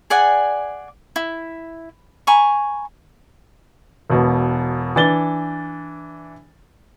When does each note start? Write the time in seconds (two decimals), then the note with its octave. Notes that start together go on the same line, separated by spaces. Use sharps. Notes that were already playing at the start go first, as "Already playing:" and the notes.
0.10 G#4 D5 F#5 G#5
1.16 E4
2.27 G#5 A#5 B5 C#6
4.10 E1 B2
4.96 E3 D4 A6 G7